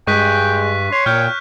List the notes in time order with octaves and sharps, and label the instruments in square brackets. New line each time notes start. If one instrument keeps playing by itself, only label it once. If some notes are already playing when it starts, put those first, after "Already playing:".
[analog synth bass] G2 [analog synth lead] G#3 [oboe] G5 [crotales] C#6 F#6 B6
[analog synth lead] C#5 [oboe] C6
[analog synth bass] A#2 [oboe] G5 [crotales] F6 G6